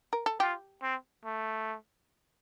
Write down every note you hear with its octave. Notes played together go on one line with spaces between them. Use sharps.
A#4
A4
F4 G4
C4
A3